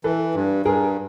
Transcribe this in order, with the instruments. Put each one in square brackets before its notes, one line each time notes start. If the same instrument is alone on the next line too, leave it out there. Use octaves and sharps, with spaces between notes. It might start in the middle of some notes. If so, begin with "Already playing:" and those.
[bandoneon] E3 [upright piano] A4 B4
[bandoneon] G2
[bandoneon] G2 [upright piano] G#4 A#4